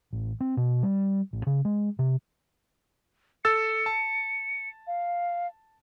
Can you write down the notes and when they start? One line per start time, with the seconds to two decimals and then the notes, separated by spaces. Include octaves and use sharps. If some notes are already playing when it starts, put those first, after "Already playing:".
0.13 A1
0.40 C4
0.57 B2
0.83 G3
1.33 A1
1.47 C#3
1.65 G#3
1.99 C3
3.45 A4 E6 A6 C#7
3.86 A5
4.87 F5